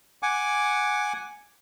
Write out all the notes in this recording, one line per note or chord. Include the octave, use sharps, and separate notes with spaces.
F#5 G#5 D6